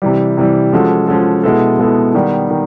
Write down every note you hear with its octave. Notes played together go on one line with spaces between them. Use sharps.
C3 E3 G3
C3 E3 G3
F3 G#3 C#4 F#4 A4
F3 G#3 C#4 F#4 A4
B2 G#3 B3 E4 A4
B2 G#3 B3 E4 A4
D#3 G3 B3
D#3